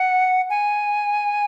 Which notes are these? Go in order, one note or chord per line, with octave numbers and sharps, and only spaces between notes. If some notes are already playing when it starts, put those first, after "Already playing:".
Already playing: F#5
G#5